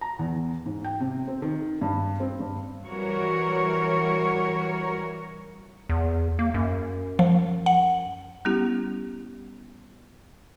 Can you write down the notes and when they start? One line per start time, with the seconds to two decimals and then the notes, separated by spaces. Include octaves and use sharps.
0.01 A#5
0.19 E2
0.66 G#2
0.85 G5
1.00 C3
1.27 C4
1.42 D#3
1.81 G2
2.20 C4
2.40 G2
2.88 E3 G3 F#4 A#4 C#5
5.89 E2
6.39 A#3
6.54 F#2
7.19 F3
7.66 F#5
8.45 G3 B3 C#4 E4 G4